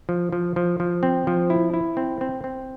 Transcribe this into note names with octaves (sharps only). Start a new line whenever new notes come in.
F3
F3
F3
F3
C4
F3
E4
E4
C4
C4
C4